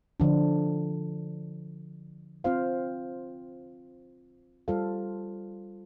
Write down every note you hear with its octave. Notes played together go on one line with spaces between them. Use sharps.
D3 F3 D4
C4 F4 C5 F5
G3 F4 A4 C5 F5